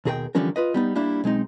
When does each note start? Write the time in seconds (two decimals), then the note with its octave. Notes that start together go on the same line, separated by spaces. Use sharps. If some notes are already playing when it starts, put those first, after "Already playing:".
0.05 D#2 B2 G#4 A#4 B4 G5
0.35 D3 E3 F3 G3 C#4 A#4
0.56 F4 B4 D#5
0.74 G3 B3 D#4
0.96 G3 A#3 D4 E4
1.24 B1 G#3 C4 D#4